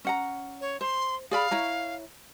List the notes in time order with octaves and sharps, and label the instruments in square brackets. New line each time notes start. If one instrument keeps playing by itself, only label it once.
[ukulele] C#4 F#5 A#5
[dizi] C#5
[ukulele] C5 [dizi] C6
[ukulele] G#4 D5 B5 [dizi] F5
[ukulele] E4 C#5 A#5